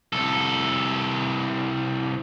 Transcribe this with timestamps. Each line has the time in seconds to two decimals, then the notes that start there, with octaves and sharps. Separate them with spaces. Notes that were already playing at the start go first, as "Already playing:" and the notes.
0.13 C2 A4